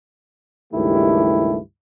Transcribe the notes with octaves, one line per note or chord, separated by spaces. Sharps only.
C#2 G2 D#3 A3 E4 G4